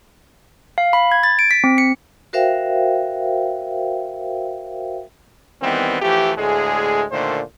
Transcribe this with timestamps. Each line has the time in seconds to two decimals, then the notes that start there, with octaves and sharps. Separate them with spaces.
0.78 F5
0.93 B5
1.12 G#6
1.23 A6
1.39 D7
1.51 B6
1.64 C4
1.78 C#7
2.33 F#4 A#4 C5 E5 F5 G5
5.62 D#3 E3 G3 B3 C4
6.01 E3 F3 A3 G4
6.36 D2 A2 G#3 G#4
7.12 A#2 D3 D#3 A3 C5